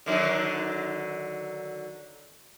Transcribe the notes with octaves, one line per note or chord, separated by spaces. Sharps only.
D3 D#3 F#3